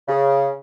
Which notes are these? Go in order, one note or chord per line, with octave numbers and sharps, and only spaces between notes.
C#3